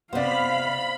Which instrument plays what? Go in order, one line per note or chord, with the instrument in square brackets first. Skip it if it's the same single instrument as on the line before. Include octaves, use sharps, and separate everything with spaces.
[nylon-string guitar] C3 C5 [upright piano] B3 D5 [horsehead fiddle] F5 [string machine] B5